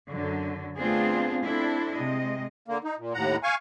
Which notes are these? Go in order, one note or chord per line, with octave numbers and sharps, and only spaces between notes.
F#2 D3 F#3
A3 B3 C4 D4 F4 G#4
C4 D4 E4 A4
C3 G#3 D#5
D3 A#3
D#4
A#2
D#2 A2 F#5 A#5
F5 G#5 C#6